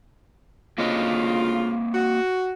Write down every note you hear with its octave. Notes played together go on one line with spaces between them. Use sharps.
D2 C#3 A#3 C4 F4 D#5
F#4